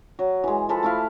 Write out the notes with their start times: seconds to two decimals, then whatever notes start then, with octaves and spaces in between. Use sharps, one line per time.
0.19 F#3
0.44 E3 G#3
0.69 F3 A4 B4
0.83 A3 E4 F5